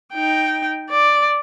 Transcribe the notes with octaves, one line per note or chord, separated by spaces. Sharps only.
D#4 G5
D5